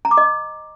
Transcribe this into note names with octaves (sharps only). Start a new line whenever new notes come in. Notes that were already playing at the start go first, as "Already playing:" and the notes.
A#5
D6
D#5